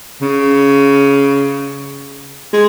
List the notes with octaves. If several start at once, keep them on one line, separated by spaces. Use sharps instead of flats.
C#3
G#3